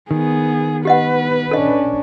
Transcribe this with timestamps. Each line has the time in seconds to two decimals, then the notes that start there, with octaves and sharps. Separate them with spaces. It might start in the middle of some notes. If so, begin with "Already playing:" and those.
0.11 D#3 B3 G#4
0.85 B3 G4 B4 D#5 F#5
1.51 C#4 D4 A4 D#5